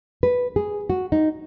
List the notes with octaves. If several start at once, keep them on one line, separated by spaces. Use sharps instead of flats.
B4
G#4
F#4
D#4